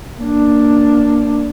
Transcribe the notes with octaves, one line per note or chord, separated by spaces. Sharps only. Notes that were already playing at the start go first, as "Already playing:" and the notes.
A#3 D4